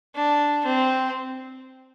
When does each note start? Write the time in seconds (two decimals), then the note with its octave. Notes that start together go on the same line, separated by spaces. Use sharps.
0.15 D4
0.65 C4